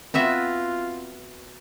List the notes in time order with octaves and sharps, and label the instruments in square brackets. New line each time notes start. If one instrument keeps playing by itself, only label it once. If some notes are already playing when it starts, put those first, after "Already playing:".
[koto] B3 F#4 E5 [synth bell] C4 [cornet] F4